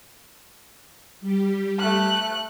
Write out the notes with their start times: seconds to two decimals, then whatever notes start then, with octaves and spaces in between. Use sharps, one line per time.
1.21 G3 G4
1.80 A3 F#6